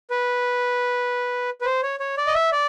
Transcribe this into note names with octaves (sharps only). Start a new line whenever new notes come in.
B4
B4
C5
C#5
C#5
D5
D#5
E5
D5